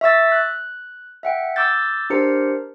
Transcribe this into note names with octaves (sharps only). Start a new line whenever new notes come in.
E5 C#6 E6 A6
F#6
E5 F#5 G5
A#5 D6 E6 G6 A6
D4 G4 A#4 C5 A#5 C#7